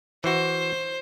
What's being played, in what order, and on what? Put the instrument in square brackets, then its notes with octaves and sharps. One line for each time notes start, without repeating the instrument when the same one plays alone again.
[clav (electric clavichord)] E3 F#4 [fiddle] C5